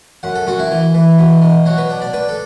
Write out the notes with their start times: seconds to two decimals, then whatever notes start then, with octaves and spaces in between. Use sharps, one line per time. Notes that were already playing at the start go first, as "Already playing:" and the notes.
0.23 F#2 F#5
0.35 A4
0.47 F#2 F#4
0.59 E4
0.71 E3
0.94 E3
1.18 B2
1.42 B2
1.66 F#3 F#4
1.78 B4
1.89 D4
2.02 D5
2.13 D4 B4
2.29 A4